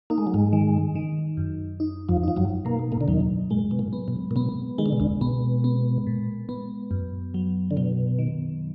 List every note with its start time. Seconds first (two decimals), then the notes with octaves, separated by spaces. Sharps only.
0.10 A#3 D#4
0.18 G#3
0.27 F#3
0.34 G#2 G#3
0.53 D#3
0.95 D#3
1.37 F#2
1.80 D#4
2.09 F2 F3
2.23 F3 D#4
2.37 F#2 F#3
2.65 B2 A#3
2.92 A#2 A#3
3.01 D3
3.08 D#2 D#3 F#3
3.51 A#2 G#3
3.71 B2
3.79 A#2
3.93 B3
4.08 B2
4.31 A#2
4.36 B2 B3
4.78 D#3 G#3
4.86 D3
4.92 B2
5.00 D2 D3
5.21 B2 B3
5.64 B3
6.07 A#2
6.49 B3
6.91 F#2
7.34 F#3
7.71 D3
7.77 B2 F#3
8.19 D#3